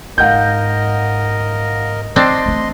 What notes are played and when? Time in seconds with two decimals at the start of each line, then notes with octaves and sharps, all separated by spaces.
0.18 G#2 A#4 D#5 F5 F#5 G6
2.16 G#1 C4 D4 D#5 C6
2.44 E3 A3